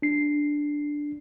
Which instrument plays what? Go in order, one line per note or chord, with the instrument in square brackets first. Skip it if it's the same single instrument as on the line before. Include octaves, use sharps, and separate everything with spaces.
[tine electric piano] D4 C7